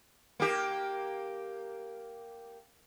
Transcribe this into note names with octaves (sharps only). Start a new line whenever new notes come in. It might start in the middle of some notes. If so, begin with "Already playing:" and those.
A#3 G4